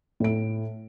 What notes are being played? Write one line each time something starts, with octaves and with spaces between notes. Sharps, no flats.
A2 D7